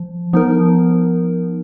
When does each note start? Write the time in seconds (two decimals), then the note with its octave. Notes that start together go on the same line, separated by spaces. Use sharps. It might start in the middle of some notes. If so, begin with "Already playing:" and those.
Already playing: F3
0.33 F3 B3 D#4 A#4